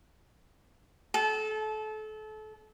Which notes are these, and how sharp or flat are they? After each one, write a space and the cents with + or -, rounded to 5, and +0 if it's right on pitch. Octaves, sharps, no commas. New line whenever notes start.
A4 -30